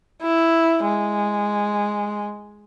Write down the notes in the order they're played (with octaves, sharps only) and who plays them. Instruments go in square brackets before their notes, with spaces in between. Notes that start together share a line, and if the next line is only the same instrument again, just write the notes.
[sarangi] E4
G#3